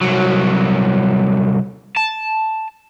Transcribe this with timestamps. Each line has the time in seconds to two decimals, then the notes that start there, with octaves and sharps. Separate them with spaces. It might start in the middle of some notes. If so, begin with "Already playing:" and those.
0.01 C2 F#3
1.96 A5